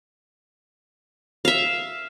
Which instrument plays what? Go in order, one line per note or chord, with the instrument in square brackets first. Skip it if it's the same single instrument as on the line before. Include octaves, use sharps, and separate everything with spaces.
[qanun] E5 F5